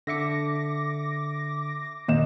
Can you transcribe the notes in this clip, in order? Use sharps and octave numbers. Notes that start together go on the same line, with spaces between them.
D3 E5 D6 A#6 C#7
D#2 A#2 D#5 E7